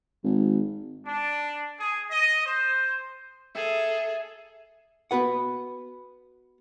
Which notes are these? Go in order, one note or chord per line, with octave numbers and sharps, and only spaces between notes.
G#1
D4
G#4
D#5
C5
G#4 A4 E5 A#5
B3 F#4 B4 F#5